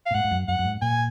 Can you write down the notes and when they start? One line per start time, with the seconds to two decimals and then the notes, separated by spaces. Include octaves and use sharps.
0.06 F5
0.11 A#2
0.14 G#2 F#5
0.24 G#2
0.31 F#2
0.48 F#2 F#5
0.59 F#2
0.65 G#2
0.82 A#2 G#5